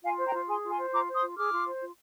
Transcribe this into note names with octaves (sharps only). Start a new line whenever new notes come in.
F4 F5 G#5
C5
G5 A#5
F4
G#4 G#5 C6
F4
G#5 C6
C5
F4 A#5 D6
C5
C6 D#6
F4
G#4 D6 F6
F4
C5
F4